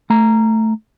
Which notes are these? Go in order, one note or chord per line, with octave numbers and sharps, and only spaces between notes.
A3 A#5